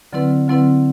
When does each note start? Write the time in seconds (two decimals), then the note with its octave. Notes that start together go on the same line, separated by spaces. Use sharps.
0.13 D3 F#3 C4 E4 B4
0.48 D3 F#3 C4 E4 B4